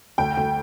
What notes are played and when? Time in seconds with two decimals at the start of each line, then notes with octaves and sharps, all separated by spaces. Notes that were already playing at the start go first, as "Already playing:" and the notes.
0.18 D2 G5
0.37 D2